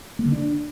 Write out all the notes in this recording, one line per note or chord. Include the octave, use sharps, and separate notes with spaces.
A#3
D3
D4